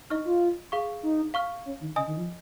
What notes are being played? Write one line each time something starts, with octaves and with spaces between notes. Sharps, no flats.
D#4 D#5 C#6 F6
F4
G#4 F5 C#6
D#4
F5 C#6 F6
C#4
D#3
C#3 D#5 G#5 D#6
D#3
F3